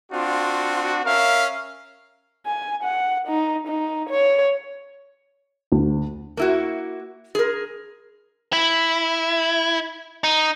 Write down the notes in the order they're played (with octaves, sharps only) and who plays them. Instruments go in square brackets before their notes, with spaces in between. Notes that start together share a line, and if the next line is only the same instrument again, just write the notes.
[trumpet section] C4 D4 F4 F#4
C#4 A#4 E5 F5
[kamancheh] G#5
F#5
D#4
D#4
C#5
[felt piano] D2
[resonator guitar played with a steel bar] A#3 E4 F#4
G#4 A#4
[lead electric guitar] E4
D#4